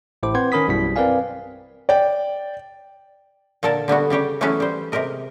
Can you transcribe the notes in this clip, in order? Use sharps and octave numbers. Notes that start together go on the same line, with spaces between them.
A1 A2 E4 C5 D6
C4 B4 C5 F#5 C6 G#6
D#3 C#4 A#4 B5 D#6 B6
A#1 F#2 B2 G3 E4 B6
C4 A#4 B4 D5 F5 G#5
D5 G5
A#2 D3 A4 A#4 A5
D3 G3 B3 F#4
C#3 G3 G4 C#5
E3 F#3 A3 B3 C#4 E4
G3 C5
C3 G#3 G4 A#4 D#5